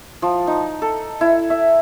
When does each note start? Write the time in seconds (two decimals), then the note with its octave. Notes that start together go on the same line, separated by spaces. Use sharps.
0.22 F3
0.47 D#4
0.82 A4
1.21 E4
1.50 E5